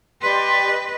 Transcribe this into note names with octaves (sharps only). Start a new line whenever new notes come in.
G4 B4 D5 D#5 C6